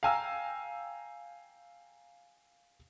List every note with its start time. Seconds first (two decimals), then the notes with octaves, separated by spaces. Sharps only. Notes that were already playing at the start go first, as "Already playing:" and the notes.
0.03 F5 G5 G#5 A#5 E6